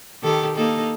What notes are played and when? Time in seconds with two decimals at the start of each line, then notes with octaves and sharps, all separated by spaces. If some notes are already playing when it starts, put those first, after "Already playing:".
0.23 D#3 G4 A4
0.56 A#3 D#4 A4